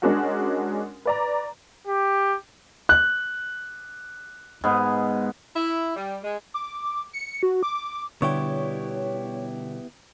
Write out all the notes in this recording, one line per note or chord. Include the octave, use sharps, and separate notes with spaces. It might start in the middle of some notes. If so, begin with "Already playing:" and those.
G#3 C#4 D4 F#4 A#4 F#5
B4 D5 A#5
G4
F#6
G#2 B3
E4
G3
G#3
D6
C#7
F#4
D6
B2 D3 G3 B3 E4 G4 C#5